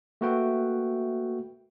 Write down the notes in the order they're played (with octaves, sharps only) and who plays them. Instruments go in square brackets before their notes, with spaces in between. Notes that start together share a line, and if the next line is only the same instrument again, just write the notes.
[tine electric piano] A3 A#3 F#4 B4 E5 G5